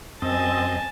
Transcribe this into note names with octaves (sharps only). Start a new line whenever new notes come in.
F#2 C4 D#5 G#5 A5